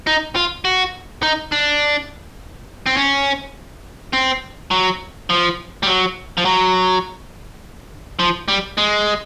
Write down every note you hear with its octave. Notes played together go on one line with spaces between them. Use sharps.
D#4
F4
F#4
D#4
D4
C4
C#4
C4
F#3
F3
G3
F#3
F3
F#3
F3
G3
G#3